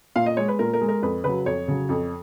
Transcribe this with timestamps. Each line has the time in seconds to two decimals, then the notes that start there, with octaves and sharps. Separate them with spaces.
0.16 A#2 F5
0.26 D#5
0.37 G#3 C#5
0.48 B4
0.59 A#2 A#4
0.73 A#4
0.81 G#3
0.89 A#4
1.03 F2 B4
1.24 C#3 F#3 B4
1.46 F2 C#5
1.68 C#3 F#3
1.89 F2